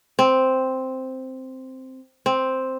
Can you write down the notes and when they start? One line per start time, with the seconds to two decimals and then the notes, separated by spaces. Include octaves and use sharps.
0.19 C4
2.26 C4